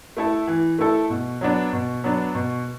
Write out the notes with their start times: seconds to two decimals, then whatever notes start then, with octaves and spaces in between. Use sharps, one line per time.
0.17 A3 E4 A4
0.47 E3
0.79 A3 E4 A4
1.10 B2
1.41 F#3 B3 D4
1.73 B2
2.04 F#3 B3 D4
2.35 B2